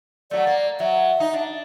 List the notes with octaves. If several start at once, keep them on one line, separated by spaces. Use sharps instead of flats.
F#3 A3 D5
A#3
F#3 E5
D#4
D4